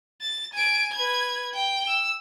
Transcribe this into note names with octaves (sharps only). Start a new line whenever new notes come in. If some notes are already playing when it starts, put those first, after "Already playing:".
A6
G#5 D7
B4 G#6
G5
E6